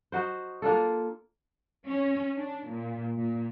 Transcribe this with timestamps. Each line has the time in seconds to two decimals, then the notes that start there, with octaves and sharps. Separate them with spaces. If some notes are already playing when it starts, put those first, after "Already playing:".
0.12 D#4 F#4 C5
0.62 A#3 D4 F4 A4
1.86 C#4
2.36 D4
2.67 A#2
3.17 A#2